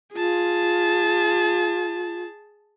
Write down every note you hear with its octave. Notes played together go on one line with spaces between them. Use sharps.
F4 G#4 A5